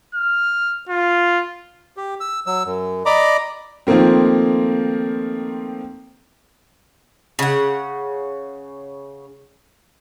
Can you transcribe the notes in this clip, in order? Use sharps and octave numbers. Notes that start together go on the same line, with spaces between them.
F6
F4
G4
E6
F#3 E6
F#2
D5 D#5 A#5 B5 D6
D#3 F3 A3 A#3 C4
C#3 F#5